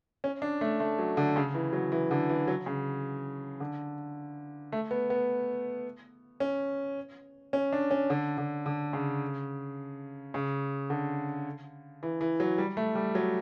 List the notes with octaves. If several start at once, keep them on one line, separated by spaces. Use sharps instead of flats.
C#4
D4
A3
A3
F#3
D3
C#3
E3
F#3
E3
D3
E3
F#3
C#3
D3
A3
B3
B3
C#4
C#4
D4
C#4
D3
D3
D3
C#3
C#3
D3
E3
E3
F#3
G3
A3
G3
F#3